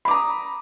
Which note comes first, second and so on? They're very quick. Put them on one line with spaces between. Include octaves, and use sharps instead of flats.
B5 D6 A#5 D#6